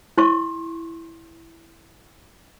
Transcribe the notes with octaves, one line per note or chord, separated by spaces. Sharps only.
E4 C6 C#6